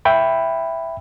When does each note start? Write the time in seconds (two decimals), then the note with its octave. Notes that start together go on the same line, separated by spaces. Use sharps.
0.05 E5 G5 B5